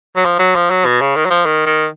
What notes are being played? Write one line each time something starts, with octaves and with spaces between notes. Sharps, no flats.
F#3
F3
F#3
F3
F#3
B2
C#3
D#3
F#3
F3
D#3
D#3